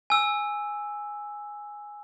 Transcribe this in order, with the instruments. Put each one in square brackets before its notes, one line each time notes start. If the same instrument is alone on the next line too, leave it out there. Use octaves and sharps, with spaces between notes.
[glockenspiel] G#5 E6